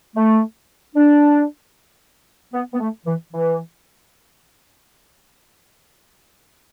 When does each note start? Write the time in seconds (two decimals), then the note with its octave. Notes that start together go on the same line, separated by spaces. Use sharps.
0.16 A3
0.95 D4
2.53 B3
2.74 B3
2.80 A3
3.06 E3
3.33 E3